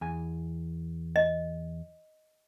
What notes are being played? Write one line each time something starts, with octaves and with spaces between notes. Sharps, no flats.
E2 G#5
D#5